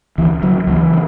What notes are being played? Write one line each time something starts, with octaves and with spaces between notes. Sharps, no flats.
C#2 E3
C#3 F#3
C#2 E3
C#3